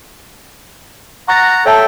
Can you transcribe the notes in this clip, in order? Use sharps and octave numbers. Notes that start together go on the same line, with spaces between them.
F#5 A#5 C#6 A6 A#6
A4 C#5 E5 G5 A5